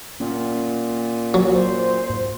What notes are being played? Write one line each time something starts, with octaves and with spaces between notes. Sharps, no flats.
A#2 A#3 C#4
F#3
C5
G#2